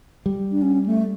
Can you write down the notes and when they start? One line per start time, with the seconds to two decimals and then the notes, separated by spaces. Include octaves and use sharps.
0.26 G3
0.52 D4
0.62 C#4
0.86 A3